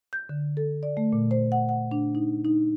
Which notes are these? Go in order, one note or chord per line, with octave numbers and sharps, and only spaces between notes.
G6
D3
A4
D5
A3
A#2
C5
F#5
F#5
D4
D#4
D#4